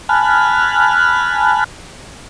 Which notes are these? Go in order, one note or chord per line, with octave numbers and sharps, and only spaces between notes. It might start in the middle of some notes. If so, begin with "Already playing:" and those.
G#5 A5 B5 F6 F#6